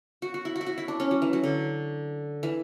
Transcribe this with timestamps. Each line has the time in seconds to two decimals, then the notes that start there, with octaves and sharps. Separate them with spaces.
0.22 F#4
0.34 F#4
0.45 E4
0.56 F#4
0.61 E4
0.66 F#4
0.78 E4
0.88 D4
1.00 C#4
1.11 F#3
1.22 E3
1.33 F#3
1.44 D3
2.43 E3